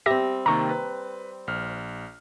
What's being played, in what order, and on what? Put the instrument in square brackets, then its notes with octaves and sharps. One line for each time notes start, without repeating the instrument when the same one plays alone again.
[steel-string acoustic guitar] G3 C4 [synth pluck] G4 E5 A#6
[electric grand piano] C3 D#3 A#3 [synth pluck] A#5 C#6
[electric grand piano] B4
A#1 F6